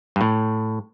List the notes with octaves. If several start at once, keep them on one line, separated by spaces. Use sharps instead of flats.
G2
A2